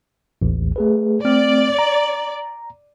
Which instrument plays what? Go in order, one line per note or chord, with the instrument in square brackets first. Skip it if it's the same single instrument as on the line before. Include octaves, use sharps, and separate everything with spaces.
[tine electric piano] A1 D#2
A3 G#4 B4
[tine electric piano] A3 C4 F6 [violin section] D5
[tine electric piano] A#5